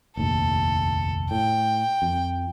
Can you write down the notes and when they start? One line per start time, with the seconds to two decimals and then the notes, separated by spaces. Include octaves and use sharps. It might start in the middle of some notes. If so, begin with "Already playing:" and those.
0.17 F1 A#1 D#2 A4
1.31 A2 G5
2.02 F2